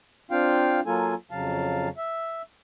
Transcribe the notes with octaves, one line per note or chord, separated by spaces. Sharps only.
C4 D4 F4 F5 G5
F#3 A#3 F4 A4 G#5
F2 C#3 F#3 F5 A5
E5